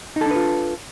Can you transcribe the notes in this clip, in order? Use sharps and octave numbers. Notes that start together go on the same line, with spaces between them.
D4 D#4 F4 A4 B4